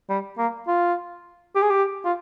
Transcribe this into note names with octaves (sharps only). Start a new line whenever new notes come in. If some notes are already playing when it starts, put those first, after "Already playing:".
G3
A#3
F4
G4
G#4
G4
F4